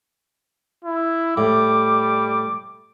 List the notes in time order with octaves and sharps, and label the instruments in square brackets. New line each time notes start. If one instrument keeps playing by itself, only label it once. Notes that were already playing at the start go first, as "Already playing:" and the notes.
[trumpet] E4
[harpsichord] A2 [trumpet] G3 [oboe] D6